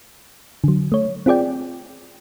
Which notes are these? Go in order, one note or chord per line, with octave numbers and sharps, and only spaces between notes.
D3 F#3
A3 C#5
C4 F4 G#4 D5 G5